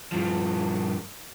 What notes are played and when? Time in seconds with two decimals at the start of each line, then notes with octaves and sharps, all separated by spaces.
0.12 G2 F3